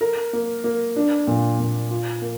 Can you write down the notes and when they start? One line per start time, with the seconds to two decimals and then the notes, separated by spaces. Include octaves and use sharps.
0.01 A#4
0.33 A#3
0.64 A#3
0.96 D4
1.27 A#2
1.60 A#2
1.90 F4
2.22 A#3